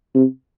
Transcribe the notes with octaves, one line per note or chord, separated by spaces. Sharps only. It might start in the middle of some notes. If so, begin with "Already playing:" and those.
C3